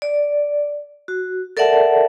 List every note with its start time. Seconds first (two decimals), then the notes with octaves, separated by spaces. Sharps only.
0.02 D5
1.08 F#4
1.57 A4 A#4 D5 E5 F#5 A5